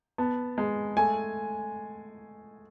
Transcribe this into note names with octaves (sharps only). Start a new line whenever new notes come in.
B3 A5
G#3
A3 G#5